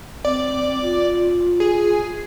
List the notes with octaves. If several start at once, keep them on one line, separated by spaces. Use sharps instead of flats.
C4 D5
F4
G#4